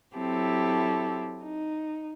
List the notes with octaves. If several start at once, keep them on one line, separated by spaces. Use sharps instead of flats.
F#3 C4 E4 G4 A4
D#4